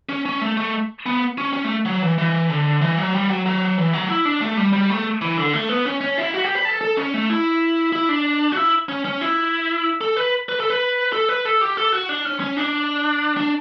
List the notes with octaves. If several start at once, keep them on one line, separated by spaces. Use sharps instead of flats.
C#4
C#4
A3
A3
B3
C#4
C#4
A3
F#3
E3
E3
D3
E3
F#3
G3
F#3
F#3
E3
F#3
E4
D4
A3
G3
G3
A3
E3
D3
A3
B3
C#4
C#4
E4
F#4
G4
B4
A4
A4
C#4
A3
E4
E4
D4
F#4
E4
C#4
C#4
E4
A4
B4
B4
A4
B4
A4
B4
A4
G4
A4
F#4
D4
C#4
C#4
D4
D4